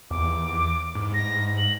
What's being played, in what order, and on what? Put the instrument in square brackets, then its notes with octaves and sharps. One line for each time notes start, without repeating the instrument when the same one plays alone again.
[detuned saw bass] E2 [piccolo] D6
[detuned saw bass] G#2
[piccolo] A#6
F#7